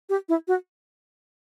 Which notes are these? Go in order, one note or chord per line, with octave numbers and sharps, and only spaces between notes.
G4
E4
F#4